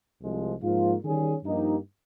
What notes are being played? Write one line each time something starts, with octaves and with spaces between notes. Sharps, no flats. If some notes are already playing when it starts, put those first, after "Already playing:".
C2 C3 F3 G#3
G#2 F3 A#3 F4
D#3 G3 C#4 G#4
G2 F3 A#3 D#4 G4